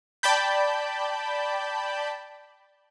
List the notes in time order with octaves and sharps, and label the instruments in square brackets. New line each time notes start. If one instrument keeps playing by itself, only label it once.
[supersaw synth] D5 G5 A5 B5 G6